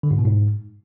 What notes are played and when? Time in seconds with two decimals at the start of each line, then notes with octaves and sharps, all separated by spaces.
0.03 D3
0.11 G#2
0.18 B2
0.26 G#2